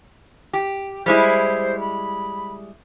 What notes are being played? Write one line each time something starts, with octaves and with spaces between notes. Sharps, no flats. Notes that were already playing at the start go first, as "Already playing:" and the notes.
G4
G3 G#3 E4 C5
B5